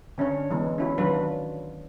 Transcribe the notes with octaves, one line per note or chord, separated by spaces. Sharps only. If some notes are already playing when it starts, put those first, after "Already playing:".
D3 C#4 D4 C#5
E3 G#3 B3
C#4 E4 F#4
D#3 F#3 D4 F4 B4